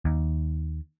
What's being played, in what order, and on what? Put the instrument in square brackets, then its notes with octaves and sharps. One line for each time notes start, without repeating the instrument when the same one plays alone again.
[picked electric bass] D#2